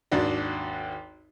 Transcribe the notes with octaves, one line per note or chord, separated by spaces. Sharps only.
G#1 D#2 D4 F#4 D5